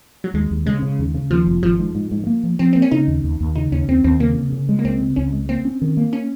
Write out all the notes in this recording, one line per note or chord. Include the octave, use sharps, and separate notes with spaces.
F#3
D#2 G#3
D#2
C#3 G#3
C#3
D#2
C#3
D#2 F3
F1
G#1 F3
G#2
G#2
G#2
A#3
F3
F3 C4
A#3 C4
C#4
C#3 D#4
D#2
D#2
D#2
C#3 D#4
D#2 C#4
D#2 C4
D#2 C4
C#3 A#3
C#3
C#3
G#3
A#3
C#2 C4
C#3
C#2 C#4
G#3
A#3 C4
C#4
D#3
A#3
C#4